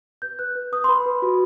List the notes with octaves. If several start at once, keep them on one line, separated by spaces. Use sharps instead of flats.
B4 G6
B4 F#6
B4
B4 D#6
C6
B4 B5
B4
F#4